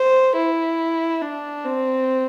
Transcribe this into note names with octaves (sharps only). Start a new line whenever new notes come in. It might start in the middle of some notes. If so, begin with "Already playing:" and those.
Already playing: C5
E4
D4
C4